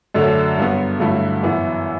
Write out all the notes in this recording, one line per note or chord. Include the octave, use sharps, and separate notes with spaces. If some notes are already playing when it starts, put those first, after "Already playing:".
F#2 D3 F#3 A3 D4
G2 F#3 B3
G2 D3 F#3 A3 E4
F#2 E3 B3